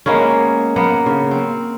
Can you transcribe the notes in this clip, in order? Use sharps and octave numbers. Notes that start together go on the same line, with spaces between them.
G#3 A#3 B3 C#4
A#3 B3
C#3
C4